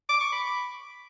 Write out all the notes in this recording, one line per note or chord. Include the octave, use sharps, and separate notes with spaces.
D6
C#6
B5